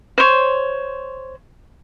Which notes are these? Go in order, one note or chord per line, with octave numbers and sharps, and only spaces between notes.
C5 C#5